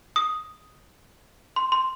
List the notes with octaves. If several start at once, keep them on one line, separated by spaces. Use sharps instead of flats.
D#6
C6
C6